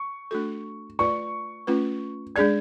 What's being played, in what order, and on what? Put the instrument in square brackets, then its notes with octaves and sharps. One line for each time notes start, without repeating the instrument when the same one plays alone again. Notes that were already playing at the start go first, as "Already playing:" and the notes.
Already playing: [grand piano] C#6
[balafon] A3 D4 F#4 A4
[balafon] A3 F4 B4 D5 [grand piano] C#6
[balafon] A3 C#4 F4 B4
[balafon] G#3 D4 G#4 D5 [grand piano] G#6